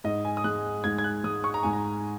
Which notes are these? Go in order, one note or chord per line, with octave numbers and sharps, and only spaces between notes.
G#2 D#5
G#5
D#6
G#3 F#6
G#2 G#6
G#6
F#6
G#3 D#6
C#6
A#5
G#2 G#5
A#5